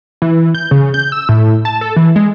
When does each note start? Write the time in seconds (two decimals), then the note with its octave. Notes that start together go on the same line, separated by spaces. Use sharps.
0.22 E3
0.55 G6
0.71 C#3
0.94 G6
1.12 E6
1.29 A2
1.65 A5
1.81 A4
1.96 E3
2.16 G#3